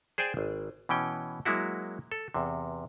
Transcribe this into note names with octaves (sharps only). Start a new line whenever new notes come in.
G#4 C5 D5 G5 G#5
G#1
B2 E3 C#4 G5
F#3 G#3 A#3 E4 F#4
A4
E2 C3